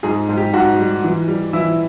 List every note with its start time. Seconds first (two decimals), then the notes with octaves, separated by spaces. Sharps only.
0.03 G#2 G#4
0.29 G#2
0.37 G4
0.54 G#2 F#4
0.78 G3
1.04 E3
1.28 G3
1.53 E3 E4